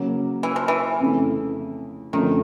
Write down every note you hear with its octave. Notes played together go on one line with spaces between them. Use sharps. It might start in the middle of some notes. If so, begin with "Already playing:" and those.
Already playing: C#3 F#3 A#3
E3
F3
E3
F2 C#3 E3 A3
F#2 D3 D#3 F3 A3 C4